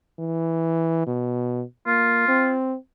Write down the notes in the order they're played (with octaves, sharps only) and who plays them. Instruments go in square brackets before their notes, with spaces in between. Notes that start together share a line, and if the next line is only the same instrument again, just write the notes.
[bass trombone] E3
B2
[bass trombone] A#3 [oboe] F4
[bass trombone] C4